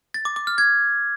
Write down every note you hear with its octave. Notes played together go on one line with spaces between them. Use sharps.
A6
D6
D6
F6
G#6